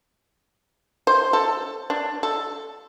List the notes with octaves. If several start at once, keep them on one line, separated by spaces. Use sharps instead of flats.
C5
A4
D4
A4